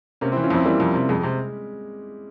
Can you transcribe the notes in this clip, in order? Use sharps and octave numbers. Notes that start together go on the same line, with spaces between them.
C3 A#3 C#4
C4 E4
E3
C#4 F4
F2 C4 E4
E3 G3 A#3
F2
C3
F2 G#3
G#3
C3